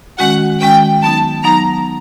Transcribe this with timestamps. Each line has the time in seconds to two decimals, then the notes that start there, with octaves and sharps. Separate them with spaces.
0.19 D#3 G#3 C#4 F#4 F#5
0.61 D#3 G#3 C#4 F#4 G5
1.02 F#3 B3 D#4 A5
1.44 F#3 B3 D#4 A#5